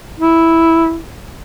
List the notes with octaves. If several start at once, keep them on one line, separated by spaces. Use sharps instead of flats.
E4